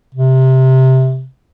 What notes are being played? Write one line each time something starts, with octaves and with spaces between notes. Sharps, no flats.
C3